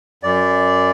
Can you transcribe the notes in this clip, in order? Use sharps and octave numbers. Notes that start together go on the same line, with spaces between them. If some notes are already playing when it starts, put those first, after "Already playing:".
F#2 D5